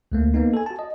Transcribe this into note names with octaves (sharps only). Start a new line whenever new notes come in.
D2 A3 A#3
A#3 B3 D#4
A4 G#5
F#4 A5
D#5